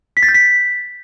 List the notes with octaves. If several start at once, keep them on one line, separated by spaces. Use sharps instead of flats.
B6
A6
G6
B6